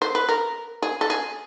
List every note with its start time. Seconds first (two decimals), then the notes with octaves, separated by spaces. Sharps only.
0.02 C5
0.15 B4
0.29 A#4
0.82 G#4
1.01 A4
1.10 G#4